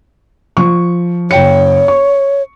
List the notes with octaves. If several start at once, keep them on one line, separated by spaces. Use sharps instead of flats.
F3 C#6
F#1 C#5 G5 C#7
C#6